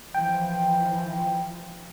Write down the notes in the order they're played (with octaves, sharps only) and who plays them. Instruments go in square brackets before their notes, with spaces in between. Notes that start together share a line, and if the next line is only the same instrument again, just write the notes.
[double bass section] E3 F3 [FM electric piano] G5